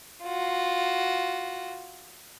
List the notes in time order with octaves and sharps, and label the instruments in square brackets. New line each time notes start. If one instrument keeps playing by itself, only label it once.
[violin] F4 F#4